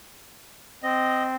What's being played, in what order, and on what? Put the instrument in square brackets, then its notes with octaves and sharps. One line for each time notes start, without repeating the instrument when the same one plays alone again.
[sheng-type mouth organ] C4 [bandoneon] D#5